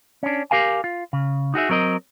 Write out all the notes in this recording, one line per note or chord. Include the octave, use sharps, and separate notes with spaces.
C#4 D4
G4 A#4 F5 G#5
F4
C#3
D#4 F#4 G#4 E5
F#3 C4 A#4 D#5